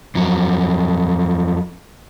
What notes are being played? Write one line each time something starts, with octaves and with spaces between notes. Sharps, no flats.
F2 F#3